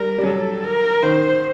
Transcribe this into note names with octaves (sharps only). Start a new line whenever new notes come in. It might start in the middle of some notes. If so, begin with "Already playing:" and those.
Already playing: G3 A#4
G3
F#3 A4
A#4
D#3 C5